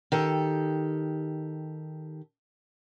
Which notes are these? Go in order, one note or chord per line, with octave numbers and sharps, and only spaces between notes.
D#3 G4 A4